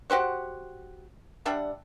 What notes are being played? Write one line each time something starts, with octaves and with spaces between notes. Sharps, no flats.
F#4 G4 C5 F#5
G3 D4 E5 F#5